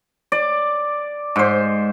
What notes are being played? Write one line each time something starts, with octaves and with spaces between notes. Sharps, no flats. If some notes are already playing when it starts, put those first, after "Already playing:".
D5
G#2 C5